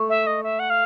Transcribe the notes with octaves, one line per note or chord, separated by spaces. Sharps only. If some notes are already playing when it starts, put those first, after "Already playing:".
Already playing: A3
E5
D#5
E5
F#5
F5